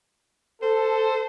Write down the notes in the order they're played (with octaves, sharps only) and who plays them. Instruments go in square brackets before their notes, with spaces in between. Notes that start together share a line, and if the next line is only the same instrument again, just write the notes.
[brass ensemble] A4 [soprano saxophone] C5